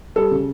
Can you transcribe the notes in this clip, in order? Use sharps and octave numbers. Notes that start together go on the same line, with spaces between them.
G3 A4
C#3